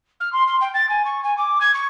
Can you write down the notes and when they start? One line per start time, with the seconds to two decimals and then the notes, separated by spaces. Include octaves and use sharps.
0.20 F6
0.33 C6
0.47 C6
0.61 G5
0.74 A6
0.89 G#5
1.05 C#6
1.23 G#5
1.38 D6
1.61 G#6
1.74 C#6